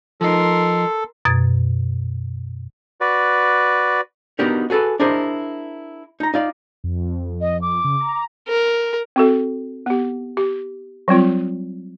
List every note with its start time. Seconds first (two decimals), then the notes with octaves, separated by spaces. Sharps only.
0.21 F3 D#4 A4 A#4 C6
1.25 F#2 B2 G#6 A6
3.01 F#4 B4 D5
4.39 B3 D4 D#4 F#4 G4 A#4
4.70 F#4 G#4 A4 B4
5.00 D4 E4 G#4 A#4 C5 D#5
6.20 D#4 A#5
6.34 D#4 F4 D5
6.84 F2
7.41 D#5
7.61 D6
7.84 C#3
8.00 A#5
8.48 A#4
9.16 C4 F#4 A4
9.86 B3 G4
10.37 G4
11.08 F#3 G3 C4 F4